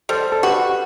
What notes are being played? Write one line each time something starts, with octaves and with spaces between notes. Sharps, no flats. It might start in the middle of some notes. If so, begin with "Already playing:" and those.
G3 A4 C5
A4
F#4 G4 B4